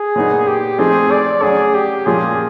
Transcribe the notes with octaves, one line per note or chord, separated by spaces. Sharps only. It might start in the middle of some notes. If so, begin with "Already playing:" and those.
Already playing: G#4
A#2 F#3 B3 D#4
G4
F3 A3 C4 D#4 G#4
D5
F#3 A3 C#4 G#4
G4
A#2 F3 G#3 C#4 F4 G#4